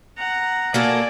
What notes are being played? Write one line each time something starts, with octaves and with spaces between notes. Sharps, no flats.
F#5 A#5
A#3 F#4 A4 D5 G#5